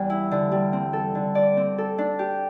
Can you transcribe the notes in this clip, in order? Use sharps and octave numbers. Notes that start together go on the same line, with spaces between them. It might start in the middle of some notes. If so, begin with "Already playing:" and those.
Already playing: E2 G3
E4
D3
G3
C4
A4
D3
D5
C4
A4
D4
G4